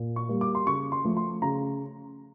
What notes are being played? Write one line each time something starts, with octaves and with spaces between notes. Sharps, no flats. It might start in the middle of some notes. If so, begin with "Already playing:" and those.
Already playing: A#2
C#6
G3 A#3
D6
C6
C#3 C#6
C6
F3 A3
C6
C#3 A#5